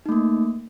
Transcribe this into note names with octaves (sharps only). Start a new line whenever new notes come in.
A3 A#3 D#4